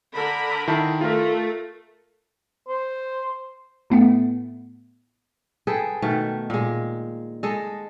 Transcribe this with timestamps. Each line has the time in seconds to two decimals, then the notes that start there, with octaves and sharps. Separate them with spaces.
0.14 D3 A#4 B5
0.68 D#3 E4 A5
1.01 A3 F4 A#4
2.69 C5
3.90 A2 A3 B3
5.67 G#4 A4 B4 G5
6.02 B2 D#3 A3
6.50 A#2 G#3
7.43 G#3 A4 D#5